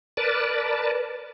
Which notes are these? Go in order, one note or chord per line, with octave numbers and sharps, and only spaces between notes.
A#4 B4 D5 A5